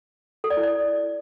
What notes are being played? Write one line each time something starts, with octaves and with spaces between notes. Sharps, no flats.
A4
D5
E4
D5